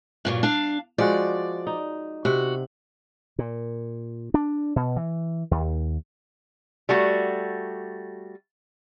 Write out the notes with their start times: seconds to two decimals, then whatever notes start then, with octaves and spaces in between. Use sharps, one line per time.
0.25 G2 A#2 F#3
0.43 D4 F5
0.98 F3 G#3 F#4 D5
1.67 D#4
2.25 C3 F#4
3.39 A#2
4.34 D4
4.76 B2
4.96 E3
5.51 D#2
6.89 G3 A3 F#4